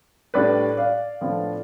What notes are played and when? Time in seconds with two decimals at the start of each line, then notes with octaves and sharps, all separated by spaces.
0.34 A2 G3 D4 B4 D5
0.77 D5 F5
1.21 A2 F3 B3 D4